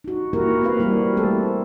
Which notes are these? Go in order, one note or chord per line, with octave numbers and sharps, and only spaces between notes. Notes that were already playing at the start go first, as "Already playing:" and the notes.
D#4 F#4
A#3 E4 F#4 G4 A#4
A#3 C4 B4 F5
G3 A#3 E4 F#4
A3 C4 E4 A4